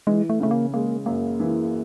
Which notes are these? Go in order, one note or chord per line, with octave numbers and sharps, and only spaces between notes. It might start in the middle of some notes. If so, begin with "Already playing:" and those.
E3 G#3
A3
C#3 A3
A#3
G#3 A#3
F#2 A#3
E3